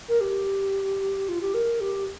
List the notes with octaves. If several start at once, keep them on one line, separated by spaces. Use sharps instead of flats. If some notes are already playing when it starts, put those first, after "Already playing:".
A#4
G4
F4
G4
A#4
G4